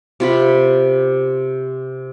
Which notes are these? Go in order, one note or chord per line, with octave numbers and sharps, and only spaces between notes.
C3 F4 B5